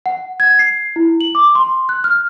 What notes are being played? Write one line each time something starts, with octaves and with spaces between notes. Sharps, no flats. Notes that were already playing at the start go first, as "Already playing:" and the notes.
F#5
G#6
C7
E4
F#7
D6
C6
F#6
F6